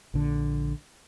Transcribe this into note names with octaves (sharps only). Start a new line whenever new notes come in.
A#1 D3